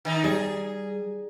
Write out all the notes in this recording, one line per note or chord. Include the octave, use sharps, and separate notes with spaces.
D#3 D#4
G3 G#4